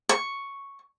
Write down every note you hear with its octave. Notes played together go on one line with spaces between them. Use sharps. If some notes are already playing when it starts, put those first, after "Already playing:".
C#6